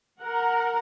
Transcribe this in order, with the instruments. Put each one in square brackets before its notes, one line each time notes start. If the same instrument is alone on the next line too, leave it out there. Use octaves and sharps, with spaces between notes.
[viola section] A#4 F#5